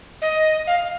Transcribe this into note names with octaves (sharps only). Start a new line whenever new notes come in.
D#5
F5